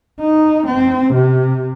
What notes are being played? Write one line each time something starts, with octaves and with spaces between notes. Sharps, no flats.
D#4
C4
C3